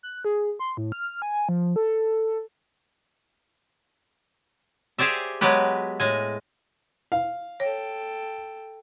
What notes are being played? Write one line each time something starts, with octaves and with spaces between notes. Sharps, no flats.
F#6
G#4
C6
A2
F6
G#5
F3
A4
G4 G#4 C5 D5 E5
F#3 G#3 B3 G4 B4
A2 G#3 G#5
F5
A4 C#5 G5